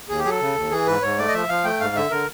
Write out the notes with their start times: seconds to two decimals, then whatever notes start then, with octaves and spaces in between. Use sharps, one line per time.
0.09 D#2 G#4
0.19 G4
0.24 F#3 G#4
0.30 A4
0.40 C#3
0.55 D#2
0.71 E3 G#4
0.87 G#2 B4
1.02 G#2 C#5
1.18 A3 D5
1.28 D#5
1.33 F3 E5
1.49 F3 F5
1.64 A3 G5
1.80 G#2 F5
1.95 D3 E5
2.11 D3 A#4